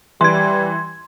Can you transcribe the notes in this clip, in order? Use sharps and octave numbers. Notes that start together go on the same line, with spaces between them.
E3 G3 C6 G#6